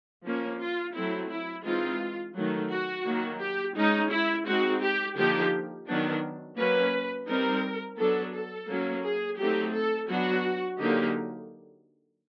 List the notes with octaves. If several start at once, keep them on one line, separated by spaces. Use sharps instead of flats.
F3 A#3 C#4
F4
F#3 A3 C4 E4
E4
E3 G#3 C4 D#4 F4
D#3 F#3 A3
F#4
D#3 F#3 A#3
G4
G#3 C#4 D#4
E4
G#3 C4 D#4 F#4
G4
D3 F3 A#3 D#4 G4
D#3 F#3 B3 D4
F#3 A#3 C#4 B4
G3 C4 D#4 A#4
F#3 B3 D4 A4
A4
F#3 A#3 C#4
G#4
F#3 A3 C4 D#4 G4
A4
F#3 B3 D4 F#4
D3 F#3 A#3 D#4 G4